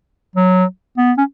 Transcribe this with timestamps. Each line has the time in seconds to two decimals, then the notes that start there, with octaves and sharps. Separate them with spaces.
0.36 F#3
0.98 B3
1.18 C#4